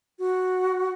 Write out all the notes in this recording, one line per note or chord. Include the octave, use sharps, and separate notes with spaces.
F#4